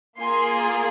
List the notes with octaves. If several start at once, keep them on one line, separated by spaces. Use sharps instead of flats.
A#3 F4 G#4 G#5 C6